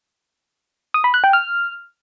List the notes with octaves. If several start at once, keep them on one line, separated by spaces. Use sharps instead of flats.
D#6
B5
F#6
G5
F6